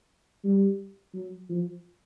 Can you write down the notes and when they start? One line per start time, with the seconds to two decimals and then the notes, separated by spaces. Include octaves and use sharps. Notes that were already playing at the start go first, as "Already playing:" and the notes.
0.44 G3
1.14 F#3
1.49 F3